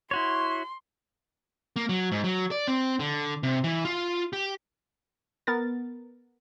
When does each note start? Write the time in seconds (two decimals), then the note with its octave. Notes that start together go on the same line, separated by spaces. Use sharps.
0.11 E4 F#4 C#5 C6
1.76 A#3
1.89 F#3
2.12 G#2
2.24 F#3
2.51 D5
2.67 C4
2.99 D3
3.43 C3
3.64 E3
3.85 F4
4.33 G4
5.47 B3 A#4 A6